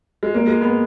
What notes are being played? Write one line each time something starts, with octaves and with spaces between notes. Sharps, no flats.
G#3
A#3
G#3
B3